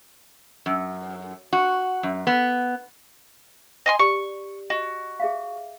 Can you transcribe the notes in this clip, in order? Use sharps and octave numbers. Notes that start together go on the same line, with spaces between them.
F#2
F#4
F#2
B3
D#5 G#5 C6
G4 D5 C#6
F#4 D#5
G#4 E5 F5